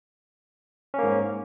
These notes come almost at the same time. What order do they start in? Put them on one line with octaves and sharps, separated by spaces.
C#4 A#3 G#2